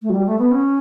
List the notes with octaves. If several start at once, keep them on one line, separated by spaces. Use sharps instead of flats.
A3
F#3
G3
A3
B3
C#4